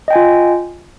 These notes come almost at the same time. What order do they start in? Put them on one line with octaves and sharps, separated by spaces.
D#5 G5 G#5 F4